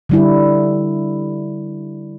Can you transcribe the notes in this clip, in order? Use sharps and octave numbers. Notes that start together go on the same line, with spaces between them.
D3 G3 E4